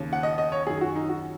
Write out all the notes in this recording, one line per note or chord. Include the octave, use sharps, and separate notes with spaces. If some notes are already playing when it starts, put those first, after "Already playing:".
Already playing: D#2 C#3
F#5
D#5
D#5
C#5
F#2 D#3 G#4
F#4
D#4
F#4